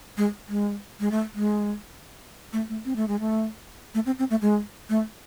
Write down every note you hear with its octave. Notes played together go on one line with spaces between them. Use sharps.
G#3
G#3
G#3
A3
G#3
A3
A3
C4
A3
G#3
A3
A3
C4
C4
A3
G#3
A3